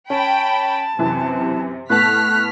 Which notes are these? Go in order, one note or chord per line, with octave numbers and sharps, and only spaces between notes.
C#4 G5 A5 B5
F#2 C3 E3
A2 B3 A5 F6 F#6 B6